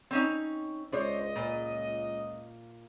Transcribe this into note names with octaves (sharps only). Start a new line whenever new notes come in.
C4 C#4 D#4
C#2 D4 C5 C#5 D#5
A#2